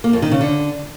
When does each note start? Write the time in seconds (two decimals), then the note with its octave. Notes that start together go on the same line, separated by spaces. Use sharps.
0.04 A#3
0.13 F2
0.22 D#3
0.32 C#3
0.41 D3